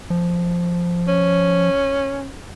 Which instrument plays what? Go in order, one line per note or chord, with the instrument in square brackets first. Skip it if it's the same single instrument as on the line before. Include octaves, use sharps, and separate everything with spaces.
[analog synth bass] F3
[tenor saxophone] C#4